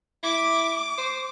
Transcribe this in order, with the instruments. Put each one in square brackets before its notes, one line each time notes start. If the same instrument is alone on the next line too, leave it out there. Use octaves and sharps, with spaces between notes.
[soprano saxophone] E4 [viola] D6
[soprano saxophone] C5